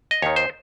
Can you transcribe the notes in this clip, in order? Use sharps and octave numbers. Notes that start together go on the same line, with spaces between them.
D#5
D#2 D#3 C#5
C5